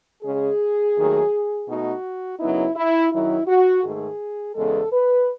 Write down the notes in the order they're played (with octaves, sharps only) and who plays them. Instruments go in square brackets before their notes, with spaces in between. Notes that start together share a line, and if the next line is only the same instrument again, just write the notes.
[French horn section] C#3 G#3 C#4 G#4
D#2 D#3 F#3 A3 D#4
B2 A3 D#4 F#4
F#2 C#3 F#3 B3 D#4 E4
E4
F#2 D#3 F#3 E4
F#4
G#2 D#3 A3 G#4
E2 C#3 G#3 B3 A4
B4